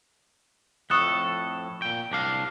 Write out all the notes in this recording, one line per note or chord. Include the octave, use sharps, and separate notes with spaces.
F2 A2 A4 C#6 D#6 F#6
A#2 G5
C2 D4 F5